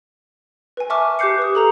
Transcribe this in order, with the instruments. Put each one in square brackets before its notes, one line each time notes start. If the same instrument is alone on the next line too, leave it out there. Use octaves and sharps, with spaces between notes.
[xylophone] B4 G#5
E5 A5 C#6 D6 F6
G4 D6 F#6 G6 C7 C#7
B4 D#6
A4 A#5 F7